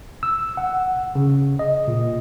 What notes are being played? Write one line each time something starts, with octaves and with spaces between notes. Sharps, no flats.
E6
F#5
C#3
D#5
A#2